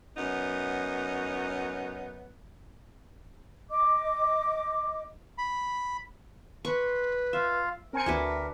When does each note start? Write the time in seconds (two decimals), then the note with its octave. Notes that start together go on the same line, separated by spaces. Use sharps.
0.17 F#2 B3 D#4
3.70 D#5 D6
5.38 B5
6.65 B4 C6 C#6
7.33 F4 E5 F5
7.93 C4 A#4 G#5 C#7
8.06 D2 D4 F#4 B4 E5